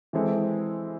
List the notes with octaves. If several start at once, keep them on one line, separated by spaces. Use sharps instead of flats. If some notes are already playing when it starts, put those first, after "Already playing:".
E3 G#3 C4 E4 A4